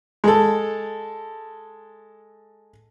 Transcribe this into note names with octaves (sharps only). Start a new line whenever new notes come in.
G#3 A4